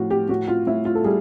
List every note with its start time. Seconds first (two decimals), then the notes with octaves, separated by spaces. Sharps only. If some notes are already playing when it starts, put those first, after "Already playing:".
Already playing: A2 F3 F4 F#4
0.11 G4
0.29 A2 F#4
0.48 F4
0.67 A2 E4
0.85 F4
0.95 A4
1.04 G3 G#4